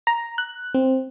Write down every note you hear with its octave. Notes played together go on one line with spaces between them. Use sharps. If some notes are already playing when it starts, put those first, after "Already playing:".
A#5
F#6
C4